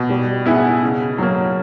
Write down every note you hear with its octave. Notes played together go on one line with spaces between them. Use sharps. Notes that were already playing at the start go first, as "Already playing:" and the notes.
Already playing: B2
G3
B3 E4 G#4 B4
C#3
F#3 A#3